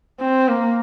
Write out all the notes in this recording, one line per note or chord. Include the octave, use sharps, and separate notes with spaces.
C4
A#3